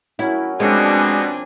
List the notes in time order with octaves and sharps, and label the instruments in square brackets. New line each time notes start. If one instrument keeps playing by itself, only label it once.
[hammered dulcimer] F#3 C#4 A#4 [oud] E4
[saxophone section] B2 [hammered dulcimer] F3 G3 A#3 [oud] G#3 [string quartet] C4 D4 G#5